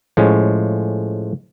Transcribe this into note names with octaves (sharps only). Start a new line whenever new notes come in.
A2 F3 G#3 C#4